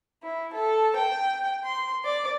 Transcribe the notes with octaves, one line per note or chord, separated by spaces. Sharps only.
E4
A4
G5
C6
D5